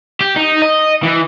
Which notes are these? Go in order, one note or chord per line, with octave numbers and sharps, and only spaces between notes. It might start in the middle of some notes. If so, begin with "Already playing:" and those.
G4
D#4
D#5
E3